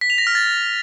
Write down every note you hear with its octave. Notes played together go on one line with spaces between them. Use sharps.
B6
F7
A#6
F6
A6